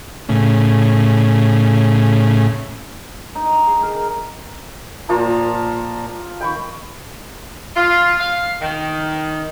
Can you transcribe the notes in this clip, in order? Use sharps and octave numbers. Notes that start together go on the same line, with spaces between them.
A2 C#3
D#4
G#4
A#4
A#2 F3 A#3 F4 A5 A#5
D#3 G5 B5 C#6
F4
F5
D#3